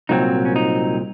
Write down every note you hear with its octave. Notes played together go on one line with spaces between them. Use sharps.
C2 A#2 F#3 A3 C4 D#4
C#4
D#4